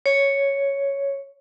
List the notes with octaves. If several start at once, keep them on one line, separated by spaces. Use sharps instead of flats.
C#5